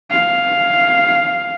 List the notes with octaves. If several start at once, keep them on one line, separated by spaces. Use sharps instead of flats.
F5